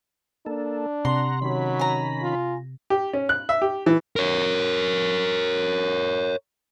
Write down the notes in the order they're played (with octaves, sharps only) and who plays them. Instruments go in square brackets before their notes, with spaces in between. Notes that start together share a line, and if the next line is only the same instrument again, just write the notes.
[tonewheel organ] A#3 A4 [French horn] D4
[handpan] C3 [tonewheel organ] F#5 A#5 [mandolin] C6
[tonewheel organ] D#3 C#4 B5 [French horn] F#3
[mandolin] G#5 A#5
[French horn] F4
[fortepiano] G4
C#4
F#6
E5
G4
E3
[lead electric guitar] A#4 C#5